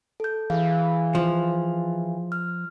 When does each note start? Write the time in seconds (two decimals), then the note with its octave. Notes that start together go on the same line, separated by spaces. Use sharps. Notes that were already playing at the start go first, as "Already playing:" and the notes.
0.20 A4 G6
0.50 E3 G#4 F5
1.15 F3
2.32 F6